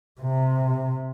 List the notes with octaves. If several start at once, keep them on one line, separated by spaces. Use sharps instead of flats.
C3